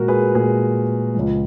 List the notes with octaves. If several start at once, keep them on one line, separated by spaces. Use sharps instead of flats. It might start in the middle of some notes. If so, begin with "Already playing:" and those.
Already playing: A#2 G#3 F#4 A#4
G#4 B4
A#2 G#3 G#4 B4
C#2 C#3 F3 G#3